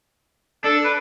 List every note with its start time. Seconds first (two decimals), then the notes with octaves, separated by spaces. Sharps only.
0.64 D4 A4
0.84 B4